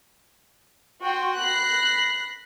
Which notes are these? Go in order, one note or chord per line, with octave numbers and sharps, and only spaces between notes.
F#4 G5 C6
B5 F#6 A#6 C7